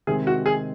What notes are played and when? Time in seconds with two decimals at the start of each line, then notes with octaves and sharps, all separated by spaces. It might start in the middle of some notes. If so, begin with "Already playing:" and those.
0.07 C3 D#3 G#3 C4 G#4
0.27 F#4
0.46 G#4